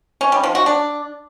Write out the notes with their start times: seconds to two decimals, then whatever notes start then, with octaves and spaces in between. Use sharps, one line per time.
0.21 C#4
0.32 G3
0.43 F3
0.55 F#4
0.66 D4